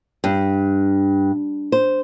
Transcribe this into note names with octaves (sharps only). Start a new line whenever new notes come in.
G2
C5